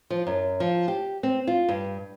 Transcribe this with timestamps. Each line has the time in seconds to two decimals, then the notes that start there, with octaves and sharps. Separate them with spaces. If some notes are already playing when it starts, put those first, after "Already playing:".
0.10 F3
0.27 F#2
0.60 F3
0.88 G4
1.23 C4
1.47 F4
1.69 G2